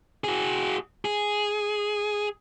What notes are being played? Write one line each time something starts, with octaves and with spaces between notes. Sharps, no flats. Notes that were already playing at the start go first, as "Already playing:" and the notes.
F#4 G#4
G#4